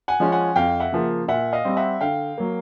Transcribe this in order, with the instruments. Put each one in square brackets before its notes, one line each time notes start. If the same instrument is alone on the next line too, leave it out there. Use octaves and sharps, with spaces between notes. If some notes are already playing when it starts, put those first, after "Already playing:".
[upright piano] F#5 G#5
F3 G#3 C#4
F#5 G#5
F2 F5 G5
E5 F#5
C#3 F3 A#3
A#2 E5 F#5
D#5 F5
G3 C4
E5 F#5
D3 F5 G5
F#3 A#3